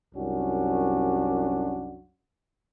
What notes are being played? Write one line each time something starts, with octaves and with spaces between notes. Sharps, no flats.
C2 F#2 C#4 D4 F#4